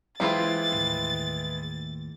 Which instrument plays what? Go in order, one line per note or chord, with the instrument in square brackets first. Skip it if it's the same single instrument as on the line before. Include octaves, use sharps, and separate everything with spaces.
[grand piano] E3 G#3 E4 [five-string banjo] A#3 C4 F4 [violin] A6
[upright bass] D#2 A2